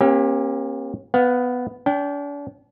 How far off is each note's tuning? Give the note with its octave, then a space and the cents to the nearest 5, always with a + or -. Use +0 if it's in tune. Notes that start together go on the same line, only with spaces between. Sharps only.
A#3 +30 C#4 -35 G4 +15
B3 +10 F5 +35
D4 -40 G5 +0